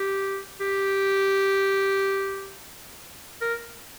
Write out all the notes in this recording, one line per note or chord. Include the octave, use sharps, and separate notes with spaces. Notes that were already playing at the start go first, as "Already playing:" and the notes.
Already playing: G4
G4
A#4